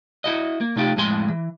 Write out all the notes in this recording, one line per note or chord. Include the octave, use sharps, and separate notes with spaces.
E4 F#4 D#5
A#3
C3 A3 D#4 F4 G4
F2 A2 G#3 G#4 G#5 C6
E3